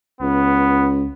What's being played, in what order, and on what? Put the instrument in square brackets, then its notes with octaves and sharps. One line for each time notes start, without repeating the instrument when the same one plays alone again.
[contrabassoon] C#2 [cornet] B3